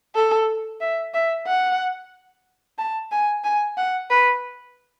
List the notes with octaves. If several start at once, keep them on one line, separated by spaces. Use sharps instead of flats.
A4
E5
E5
F#5
A5
G#5
G#5
F#5
B4